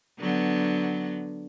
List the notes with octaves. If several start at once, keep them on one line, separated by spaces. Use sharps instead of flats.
D3 F#3 B3